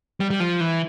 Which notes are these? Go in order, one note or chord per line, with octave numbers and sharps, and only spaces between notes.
G3
G3
F3
E3